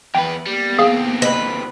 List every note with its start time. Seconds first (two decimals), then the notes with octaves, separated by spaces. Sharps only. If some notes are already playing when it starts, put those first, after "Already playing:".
0.15 E2 B4 G5
0.46 G3 A#3 B3
0.79 D#2 C4 G#4 F5
1.22 B4 D#5